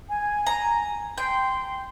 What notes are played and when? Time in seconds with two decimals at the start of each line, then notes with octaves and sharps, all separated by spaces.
0.09 G#5
0.47 A#5
1.18 G5 C6